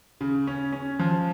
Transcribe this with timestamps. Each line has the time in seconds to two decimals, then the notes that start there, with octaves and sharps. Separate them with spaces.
0.21 C#3
0.47 C#4
0.72 C#4
0.99 F3